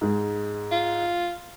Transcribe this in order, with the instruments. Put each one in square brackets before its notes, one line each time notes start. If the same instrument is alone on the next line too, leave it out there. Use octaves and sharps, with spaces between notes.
[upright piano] G#2 G#3
[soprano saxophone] F4